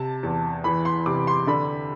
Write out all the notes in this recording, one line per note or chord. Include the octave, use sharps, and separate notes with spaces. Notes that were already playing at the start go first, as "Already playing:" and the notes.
Already playing: C3 A5
E2
E3 B5
C6
C3 D6
C6
D3 B5